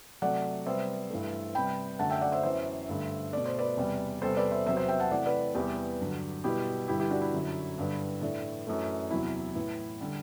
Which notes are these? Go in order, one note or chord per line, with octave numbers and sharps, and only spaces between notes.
C3 F#3 A3 D5 F#5
C3 G3 B3 C5 E5
G2 E3 A3
C3 G3 B3 G5 B5
F#2 D3 A3 F#5 A5
E5 G5
D5 F#5
C5 E5
F#2 E3 B3 C5 E5
G2 D3 A3
B2 A3 D5
C5
B4 D5
E2 C3 G3
E2 C3 G3 B3 A4 C5
B4 D5
C5 E5
E2 C3 F#3 B3 C5 E5
C5 E5
E5 G5
F#5 A5
C3 E3 A3 D5 F#5
B4 D5
E2 C3 E3 G3 B3 G4 B4
G2 D3 F#3
B2 G3 B3 E4 G4
G2 D3 G3 B3 E4 G4
E4 G4
D4 F#4
E4
F#2 D3 F#3
G2 D3 G3 B3
A2 E3 A3 D4
F#2 E3 A3
E2 C3 F#3 E4
A2 E3 B3
D3 G3